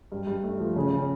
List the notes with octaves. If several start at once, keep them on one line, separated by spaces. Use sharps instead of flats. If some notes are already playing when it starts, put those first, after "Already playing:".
G2
G2
A3
F3
C#3
C#3